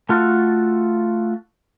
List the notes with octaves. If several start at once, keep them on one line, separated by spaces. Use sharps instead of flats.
A3 F4 F#4 A4